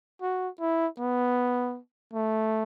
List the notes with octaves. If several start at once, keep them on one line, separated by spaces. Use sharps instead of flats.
F#4
E4
B3
A3